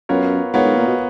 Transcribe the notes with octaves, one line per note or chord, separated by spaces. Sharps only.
F#2 B3 F4 A#4 C#5
G#2 B3 F4 A#4 C#5
G#2
A#2
B2